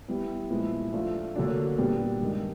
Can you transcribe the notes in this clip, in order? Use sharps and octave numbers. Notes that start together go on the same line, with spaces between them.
G3 B3 E4
A#2 F3 G#3 B3 E4
F3 A3 D4 F4
D3 F#3 A#3 D4
A#2 G3 B3 D4
G2 D#3 G#3